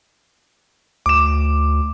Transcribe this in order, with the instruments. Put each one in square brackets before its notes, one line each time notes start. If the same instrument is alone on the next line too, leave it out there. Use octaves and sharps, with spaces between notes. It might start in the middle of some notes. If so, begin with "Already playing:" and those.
[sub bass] D2 [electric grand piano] D6 E7